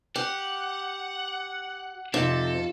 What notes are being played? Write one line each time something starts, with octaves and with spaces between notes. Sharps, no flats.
G4 F#5
F2 G#2 C3 D#4 F4 A4